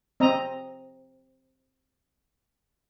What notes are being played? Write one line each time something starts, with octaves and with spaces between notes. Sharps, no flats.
C4 D#5 A#5